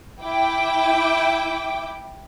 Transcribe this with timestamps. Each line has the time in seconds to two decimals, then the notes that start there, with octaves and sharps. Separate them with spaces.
0.24 E4 G5 D6